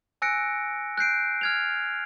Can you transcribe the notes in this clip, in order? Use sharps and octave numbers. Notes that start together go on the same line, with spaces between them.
G#5 E6 F#6 A#6 C#7 D7
F#6 G6 C7 D7
F6 G#6 F7